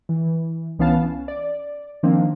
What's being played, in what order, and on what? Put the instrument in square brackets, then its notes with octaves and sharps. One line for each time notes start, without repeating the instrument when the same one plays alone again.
[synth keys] E3
C2 E3 B3 C#4 F5 A5
C#4
D5
D#3 F3 A#3 C4 D4